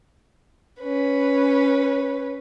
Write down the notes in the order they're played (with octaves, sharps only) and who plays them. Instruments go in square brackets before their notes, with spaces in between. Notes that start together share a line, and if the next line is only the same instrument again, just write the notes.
[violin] C#4 B4